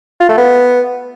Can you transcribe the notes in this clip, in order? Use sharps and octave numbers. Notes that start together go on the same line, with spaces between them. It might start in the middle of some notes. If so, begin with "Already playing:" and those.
F4
A3
B3